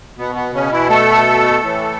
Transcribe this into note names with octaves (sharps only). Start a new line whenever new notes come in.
B2 B3
B3
C#3 C#4
E3 E4
A3 A4
A2 E3